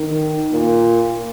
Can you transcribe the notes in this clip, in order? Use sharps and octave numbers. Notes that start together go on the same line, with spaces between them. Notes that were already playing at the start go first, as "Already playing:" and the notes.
Already playing: D#3
A#2